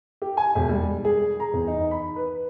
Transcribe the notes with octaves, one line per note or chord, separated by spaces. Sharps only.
G4
G#5
E1
G3
G#4
A#5
E2
D#4
B5
B4